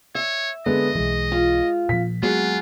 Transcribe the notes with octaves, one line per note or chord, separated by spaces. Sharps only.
C#5 E5
D3 G#3 B3 D#5
B1 E3 G#3
F4
A#2 F3 B6
F#3 G#3 A#3 B3 F4 F#4 G#4